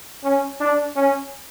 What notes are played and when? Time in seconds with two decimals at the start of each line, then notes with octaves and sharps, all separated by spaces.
0.24 C#4
0.60 D4
0.96 C#4